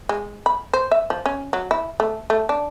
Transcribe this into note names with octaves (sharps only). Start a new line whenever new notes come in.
G#3
B5
C5
E5
F3
C#4
F#3
E4
A3
A3
D4